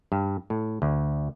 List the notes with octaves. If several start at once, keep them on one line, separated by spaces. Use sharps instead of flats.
G2
A2
D2